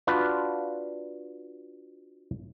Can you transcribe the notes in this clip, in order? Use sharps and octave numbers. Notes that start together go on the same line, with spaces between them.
D4 F4 F#4 B4